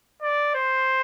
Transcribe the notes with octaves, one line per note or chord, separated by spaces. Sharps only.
D5
C5